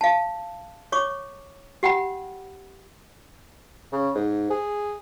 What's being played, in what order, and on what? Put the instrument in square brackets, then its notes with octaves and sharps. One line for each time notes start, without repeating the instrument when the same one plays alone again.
[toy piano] F5 A5
C#5 C#6 D6
G4 F#5 G5 B5
[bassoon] C#3
G#2
G#4